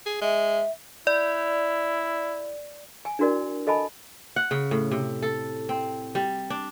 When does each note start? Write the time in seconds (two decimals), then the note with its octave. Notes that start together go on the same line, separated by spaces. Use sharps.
0.06 G#4
0.21 G#3 E5
1.07 E4 D5
3.05 G#5
3.19 D4 E4 F#4 A#4 D5
3.67 A4 D#5 G#5 A5 B5
4.36 F#5
4.51 C#3
4.71 A2
4.91 C3
5.22 A4
5.69 C4
6.15 G3
6.50 D4